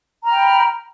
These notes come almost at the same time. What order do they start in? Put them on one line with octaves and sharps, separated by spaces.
A#5 F6 G5 B5